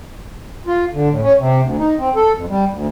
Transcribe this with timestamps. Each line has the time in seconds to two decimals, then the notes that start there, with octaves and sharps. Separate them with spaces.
0.67 F4
0.94 D3
1.09 A2
1.23 C#4
1.39 C3
1.63 D2
1.79 D#4
1.99 C4
2.16 A4
2.38 F2
2.49 G3
2.73 D2